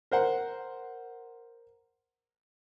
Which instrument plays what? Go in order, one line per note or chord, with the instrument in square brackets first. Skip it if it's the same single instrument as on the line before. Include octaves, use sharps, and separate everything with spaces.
[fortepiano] A#4 C5 F#5